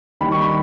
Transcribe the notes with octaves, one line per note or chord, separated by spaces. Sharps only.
D#2 D#3 G3 B5
C#6
B5